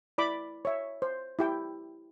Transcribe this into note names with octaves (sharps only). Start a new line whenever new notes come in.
E4 D5 B5 D6
C#5 E5
C5
E4 G4 G5